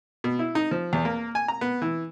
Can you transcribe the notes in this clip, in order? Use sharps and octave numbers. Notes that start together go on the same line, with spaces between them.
B2
E4
D#4
F3
E2
A#3
G#5
A#5
B3
E3